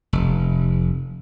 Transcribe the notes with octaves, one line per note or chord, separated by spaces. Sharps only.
F1